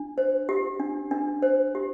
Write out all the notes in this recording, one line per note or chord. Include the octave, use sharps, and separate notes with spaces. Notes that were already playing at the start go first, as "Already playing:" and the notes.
Already playing: D4
C5
G4
D4
D4
C5
G4